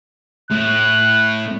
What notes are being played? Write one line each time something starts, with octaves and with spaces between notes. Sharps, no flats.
A2 F#6